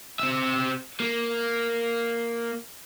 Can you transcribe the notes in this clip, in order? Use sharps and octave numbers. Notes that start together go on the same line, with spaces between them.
C4 E5
A#3